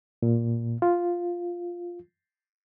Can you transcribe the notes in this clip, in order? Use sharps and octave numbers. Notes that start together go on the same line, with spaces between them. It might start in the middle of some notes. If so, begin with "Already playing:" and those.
A#2
F4